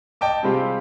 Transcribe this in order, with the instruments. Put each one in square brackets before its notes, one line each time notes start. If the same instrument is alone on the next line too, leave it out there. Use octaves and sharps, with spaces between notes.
[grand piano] D#5 G5 A5 D6
C3 G3 G#3 C4 F4 G4